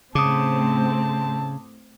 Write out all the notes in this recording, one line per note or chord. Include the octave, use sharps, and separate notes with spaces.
A2 C#3 C4 A5 D6 D#6